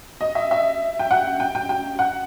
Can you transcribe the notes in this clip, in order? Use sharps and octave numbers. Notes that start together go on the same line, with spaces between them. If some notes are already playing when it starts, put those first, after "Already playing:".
D#5
E5
E5
G5
F#5
G5
G5
G5
F#5